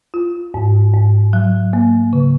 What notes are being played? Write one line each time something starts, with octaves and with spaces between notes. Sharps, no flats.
F4
G#2
G#2
F#3
A#3
C#3